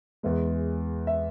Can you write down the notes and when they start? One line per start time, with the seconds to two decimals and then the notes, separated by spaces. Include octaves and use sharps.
0.23 E2 E3 G#3
1.07 E5